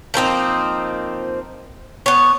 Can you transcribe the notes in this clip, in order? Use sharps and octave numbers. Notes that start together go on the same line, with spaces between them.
F3 A#3 C4 D#4
B3 C#5